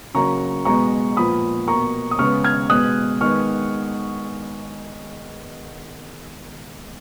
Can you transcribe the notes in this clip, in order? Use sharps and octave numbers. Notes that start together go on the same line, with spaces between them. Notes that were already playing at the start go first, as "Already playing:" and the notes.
C#3 F#3 A#3 A#5 C#6
B2 G#3 B3 A#5 C#6
A#2 F3 B3 B5 D#6
B2 A#3 A#5 C#6
D#6
C#3 G#3 B3 C#6 F6
F6 G#6
B2 G#3 B3 D#6 F#6
D#3 G#3 B3 C#6 F6